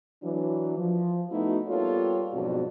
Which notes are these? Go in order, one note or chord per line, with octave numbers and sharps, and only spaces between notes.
E3 F#3 D4
F3
A3 B3 D#4 E4 F#4
G3 A#3 B3 F4 A4 C#5
F2 G#2 B2 F#3 D4 F#4